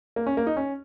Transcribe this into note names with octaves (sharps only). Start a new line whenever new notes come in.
A#3
C#4
A#3
D#4
C#4